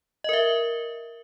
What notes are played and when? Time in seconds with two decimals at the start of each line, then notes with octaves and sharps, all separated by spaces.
0.24 D#5
0.29 A#4
0.33 E5